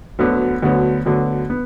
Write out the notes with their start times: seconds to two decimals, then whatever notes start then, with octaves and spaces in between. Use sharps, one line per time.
0.19 D2 D3 F#3 B3
0.62 D2 D3 F#3 B3
1.05 D2 D3 F#3 B3
1.50 B3